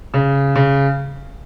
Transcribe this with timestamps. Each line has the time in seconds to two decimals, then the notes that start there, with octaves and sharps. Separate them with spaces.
0.14 C#3
0.55 C#3